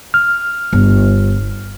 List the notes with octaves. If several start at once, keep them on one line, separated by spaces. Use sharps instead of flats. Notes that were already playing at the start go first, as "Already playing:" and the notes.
F6
G1